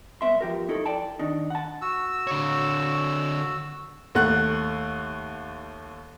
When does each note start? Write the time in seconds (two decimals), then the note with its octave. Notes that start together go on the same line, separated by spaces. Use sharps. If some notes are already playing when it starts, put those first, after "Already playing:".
0.21 C2 G#2 B3 E5 C6
0.41 F3 G4 A#4
0.69 D#4 E4 A4
0.86 D5 G5 A5
1.19 D#3 D4 D#4
1.50 F#5 A5
1.82 F#4 E6
2.27 D3 C#5
4.15 D#2 A3 F#5 F#6